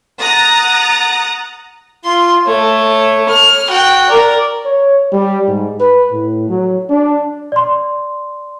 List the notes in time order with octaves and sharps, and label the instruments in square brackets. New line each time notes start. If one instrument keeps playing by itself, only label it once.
[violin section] F#5 A#5 D#6 F#6 A6
[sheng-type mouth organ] F4 [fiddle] C6
[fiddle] A3 [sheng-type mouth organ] C#5
[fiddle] F6
[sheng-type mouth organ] F#4 F#6 [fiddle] G5
[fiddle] A#4 [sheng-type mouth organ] D5
[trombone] C#5
G3
G#2
B4
A2
F#3
D4
[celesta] D5 C6